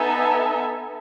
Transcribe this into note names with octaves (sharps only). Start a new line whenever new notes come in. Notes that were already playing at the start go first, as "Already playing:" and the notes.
Already playing: B3 D#4 A4 E5 G#5